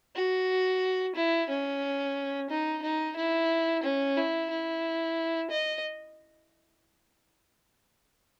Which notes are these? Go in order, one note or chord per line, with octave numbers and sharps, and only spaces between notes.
F#4
E4
C#4
D#4
D#4
E4
C#4
E4
E4
D#5